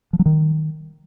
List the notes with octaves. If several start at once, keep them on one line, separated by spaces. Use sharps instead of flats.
F3
F#3
D#3